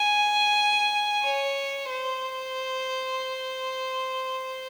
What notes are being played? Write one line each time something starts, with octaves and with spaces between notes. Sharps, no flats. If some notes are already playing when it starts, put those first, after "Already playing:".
Already playing: G#5
C#5
C5